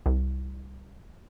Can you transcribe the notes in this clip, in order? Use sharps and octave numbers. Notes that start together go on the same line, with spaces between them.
C2